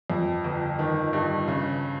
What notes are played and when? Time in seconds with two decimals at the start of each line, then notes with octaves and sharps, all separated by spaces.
0.10 F2
0.44 G1
0.79 D#3
1.13 G2
1.48 C#3